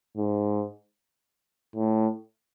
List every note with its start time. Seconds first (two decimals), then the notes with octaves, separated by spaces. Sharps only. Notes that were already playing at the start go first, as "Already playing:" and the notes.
0.17 G#2
1.76 A2